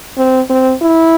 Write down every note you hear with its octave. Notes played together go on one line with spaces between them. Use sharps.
C4
C4
E4